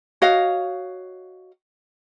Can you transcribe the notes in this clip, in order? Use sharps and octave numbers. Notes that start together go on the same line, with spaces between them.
F#4 C#5 D#5 F5